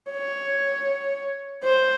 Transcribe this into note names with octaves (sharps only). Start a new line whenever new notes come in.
C#5
C5